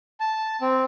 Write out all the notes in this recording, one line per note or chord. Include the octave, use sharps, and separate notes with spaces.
A5
C4